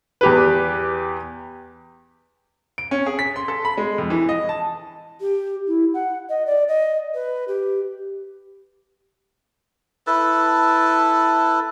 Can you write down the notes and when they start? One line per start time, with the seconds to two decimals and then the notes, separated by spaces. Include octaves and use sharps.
0.21 E2 G4 B4
2.78 D7
2.91 C#4
3.06 G#4
3.19 B6
3.36 C6
3.48 A4
3.65 B5
3.77 G#3
3.98 F2
4.10 E3
4.29 D#5
4.49 A5
5.20 G4
5.67 E4
5.94 F#5
6.29 D#5
6.46 D5
6.68 D#5
7.14 B4
7.48 G4
10.07 E4 A4 B4 A5